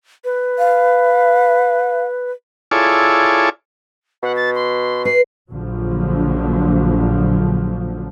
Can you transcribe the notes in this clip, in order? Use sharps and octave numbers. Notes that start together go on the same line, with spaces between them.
B4
F5
E4 F4 G#4 A4 C#5 D5
B2 F#5
A6
C6
B4 C7
A#1 D3 F3 F#3